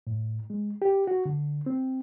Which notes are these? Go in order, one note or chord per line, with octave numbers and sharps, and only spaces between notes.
A2
G#3
G4
F#4
D3
C4